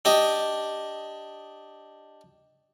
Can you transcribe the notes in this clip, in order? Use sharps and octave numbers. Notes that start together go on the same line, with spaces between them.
D4 G4 D#5